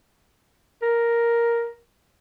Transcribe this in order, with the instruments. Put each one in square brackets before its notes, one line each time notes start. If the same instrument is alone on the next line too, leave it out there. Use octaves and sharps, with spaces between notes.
[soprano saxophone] A#4